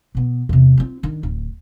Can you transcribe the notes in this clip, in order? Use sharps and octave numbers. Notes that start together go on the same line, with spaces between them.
B2 B3
E2 C3
C4 F4
D#3 D4
D1